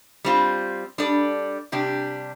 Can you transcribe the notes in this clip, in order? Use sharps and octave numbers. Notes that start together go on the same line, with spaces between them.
G3 C4 F4
G3 D4 A4 D5
C3 G3 D4 G4